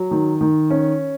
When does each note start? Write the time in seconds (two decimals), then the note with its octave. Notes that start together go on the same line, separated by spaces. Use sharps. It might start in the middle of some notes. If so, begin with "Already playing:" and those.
Already playing: F#3
0.11 D#3
0.41 D#3
0.71 C#4